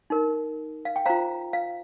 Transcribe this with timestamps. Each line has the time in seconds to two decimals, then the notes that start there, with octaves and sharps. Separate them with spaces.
0.10 D#4 A#4
0.85 F5
0.96 G5
1.06 F4 C5 F5 A#5
1.53 F5